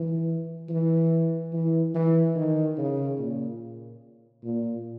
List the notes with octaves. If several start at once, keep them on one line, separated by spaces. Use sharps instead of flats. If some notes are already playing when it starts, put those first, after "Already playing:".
Already playing: E3
E3
E3
E3
D#3
C#3
A#2
A#2